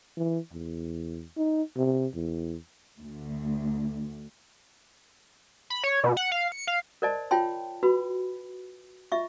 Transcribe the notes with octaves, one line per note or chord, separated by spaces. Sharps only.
E3
E2
D#4
C3
E2
D2
B5
C#5
B2
F#5
F5
C#7
F5
A#4 C5 D5 D#5 A5
F4 C#5 G5 A5 C6
F#4 B4 B5 C6
F4 D#5 E5 C#6